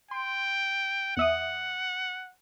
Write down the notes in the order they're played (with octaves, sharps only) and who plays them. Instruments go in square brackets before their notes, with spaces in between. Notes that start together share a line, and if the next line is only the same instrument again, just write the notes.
[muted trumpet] G5 [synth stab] C6
[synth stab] E2 E5 D#6 [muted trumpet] F#5